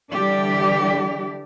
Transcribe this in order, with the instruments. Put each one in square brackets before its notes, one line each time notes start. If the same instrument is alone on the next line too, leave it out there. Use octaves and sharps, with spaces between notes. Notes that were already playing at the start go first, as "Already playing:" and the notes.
[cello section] D3 E3 G3 D4 G4 D5